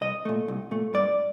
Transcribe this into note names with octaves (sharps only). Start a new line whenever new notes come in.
C2 D#5
A#2 A3
C2
A#2 A3
G2 D5